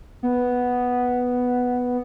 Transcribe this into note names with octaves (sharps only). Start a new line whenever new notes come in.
B3